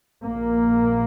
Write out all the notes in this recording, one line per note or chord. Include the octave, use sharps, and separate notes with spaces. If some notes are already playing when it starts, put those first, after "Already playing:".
A#1 A#2 A#3